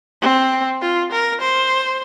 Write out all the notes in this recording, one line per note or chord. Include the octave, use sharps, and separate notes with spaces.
C4
F4
A#4
C5